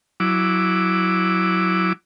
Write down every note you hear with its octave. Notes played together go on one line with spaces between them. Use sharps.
F#3 E4 D6